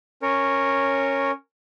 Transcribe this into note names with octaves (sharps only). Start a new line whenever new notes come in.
C#4 A#4 C#5